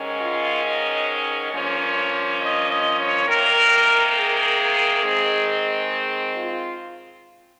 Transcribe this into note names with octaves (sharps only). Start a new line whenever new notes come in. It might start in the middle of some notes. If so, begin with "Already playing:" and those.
Already playing: G#2 D#3 G#3 C#4
F4
D#5
G2 F3 A#3 C#4 C#5
D#5
D#5
C#5
C3 D#3 A#3 A#4
G#4
D#3 G#3 C4
F4